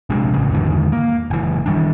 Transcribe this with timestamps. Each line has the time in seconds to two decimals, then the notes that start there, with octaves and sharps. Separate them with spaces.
0.10 A#1 C3 G#3 D4
0.33 A1 C#3
0.50 E2 G#2 D3 D#3
0.92 A#3
1.30 F#1 E3
1.66 D#3 G3 D4